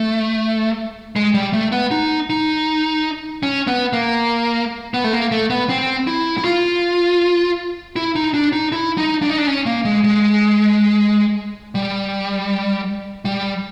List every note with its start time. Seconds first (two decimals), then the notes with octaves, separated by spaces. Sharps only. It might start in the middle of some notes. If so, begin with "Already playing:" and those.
Already playing: A3
1.16 G#3
1.34 G3
1.53 A3
1.72 B3
1.91 D#4
2.30 D#4
3.43 C#4
3.67 B3
3.93 A#3
4.94 B3
5.04 A3
5.13 A#3
5.32 A3
5.50 B3
5.69 C4
6.07 E4
6.38 E4
6.45 F4
7.96 E4
8.16 D#4
8.34 D4
8.53 D#4
8.72 E4
8.98 D#4
9.22 D4
9.30 D#4
9.38 D4
9.47 C#4
9.66 A#3
9.85 G#3
10.04 G#3
11.75 G3
13.25 G3